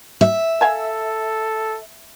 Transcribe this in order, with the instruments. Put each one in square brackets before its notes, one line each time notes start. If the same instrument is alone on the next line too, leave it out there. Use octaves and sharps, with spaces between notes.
[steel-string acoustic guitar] E5
[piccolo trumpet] A4 [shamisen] F5 G#5 A5